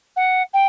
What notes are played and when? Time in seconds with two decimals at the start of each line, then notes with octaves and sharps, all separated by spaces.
0.16 F#5
0.54 G5